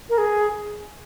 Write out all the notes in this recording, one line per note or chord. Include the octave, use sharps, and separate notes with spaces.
A#4
G#4